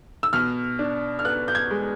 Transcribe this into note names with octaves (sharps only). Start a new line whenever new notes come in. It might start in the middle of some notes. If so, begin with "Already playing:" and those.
E6
B2 F6
D4
F6
B3 F#6
G6
G#6
G#3